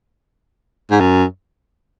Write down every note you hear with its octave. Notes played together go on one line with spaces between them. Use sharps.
G#2
F#2